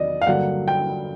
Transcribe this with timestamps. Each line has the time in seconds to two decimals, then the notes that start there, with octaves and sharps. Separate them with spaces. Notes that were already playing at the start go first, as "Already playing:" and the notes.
Already playing: E2 C3 D#3 F#3 D5 D#5
0.21 F5
0.27 G2 D3 F#3 A#3 F#5
0.68 G5